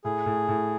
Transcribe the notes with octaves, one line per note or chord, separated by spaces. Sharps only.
A2 G#4
A2
A2